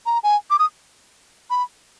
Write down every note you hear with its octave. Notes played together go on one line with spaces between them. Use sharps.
A#5
G#5
D6
D#6
B5